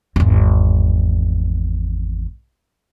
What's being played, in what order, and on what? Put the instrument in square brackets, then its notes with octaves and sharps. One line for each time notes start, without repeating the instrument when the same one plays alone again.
[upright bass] G#1 E2